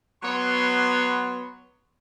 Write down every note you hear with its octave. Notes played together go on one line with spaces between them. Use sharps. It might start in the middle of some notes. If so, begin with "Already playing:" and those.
F#3 B3 C#5 C6